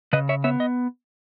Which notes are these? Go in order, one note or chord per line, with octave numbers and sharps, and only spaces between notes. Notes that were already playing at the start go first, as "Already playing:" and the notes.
C#3 B4 D#5
C#5 E5
B3 C#5 E5
D#5